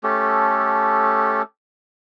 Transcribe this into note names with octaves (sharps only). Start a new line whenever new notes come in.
A3 C#4 G4 A4